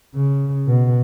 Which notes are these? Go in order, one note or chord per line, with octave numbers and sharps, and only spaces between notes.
C#3
B2